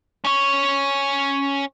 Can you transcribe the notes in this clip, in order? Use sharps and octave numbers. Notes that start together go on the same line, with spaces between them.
C#4 C#5